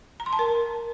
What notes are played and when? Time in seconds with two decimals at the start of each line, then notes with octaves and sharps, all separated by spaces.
0.20 A#5
0.26 C6
0.33 A5
0.39 A#4